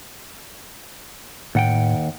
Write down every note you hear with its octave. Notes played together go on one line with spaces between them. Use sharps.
D#2 A2 F#5 G5